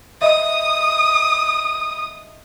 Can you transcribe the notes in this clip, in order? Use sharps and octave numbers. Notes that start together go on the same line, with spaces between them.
D#5 E5 D#6